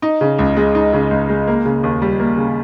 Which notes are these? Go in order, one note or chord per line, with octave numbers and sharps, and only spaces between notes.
D#4
C#3
C#2
G#3
D#4
C#3
C#2
G#3
A#3
C#3
D#2
G3
A#3
C#3